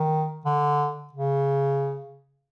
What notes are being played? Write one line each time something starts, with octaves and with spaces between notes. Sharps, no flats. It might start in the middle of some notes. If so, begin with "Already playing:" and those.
Already playing: D#3
D3
C#3